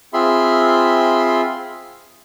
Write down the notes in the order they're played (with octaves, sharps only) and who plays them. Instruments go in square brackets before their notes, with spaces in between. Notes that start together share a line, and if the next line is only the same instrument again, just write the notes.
[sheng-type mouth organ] C4 F4 G#4 E5 B5 C6